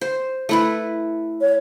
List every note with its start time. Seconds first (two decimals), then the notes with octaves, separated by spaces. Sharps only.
0.01 C5
0.49 A3 E4 B4
1.41 C#5